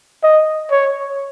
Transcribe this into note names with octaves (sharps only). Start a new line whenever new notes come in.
D#5
C#5